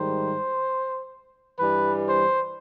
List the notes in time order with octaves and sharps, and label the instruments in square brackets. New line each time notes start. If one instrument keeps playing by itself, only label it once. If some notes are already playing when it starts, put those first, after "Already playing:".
Already playing: [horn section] G#2 D#3 G3 C5
G2 E3 G3 B4
C5